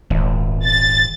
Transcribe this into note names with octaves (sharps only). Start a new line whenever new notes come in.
D#1 G#1
A6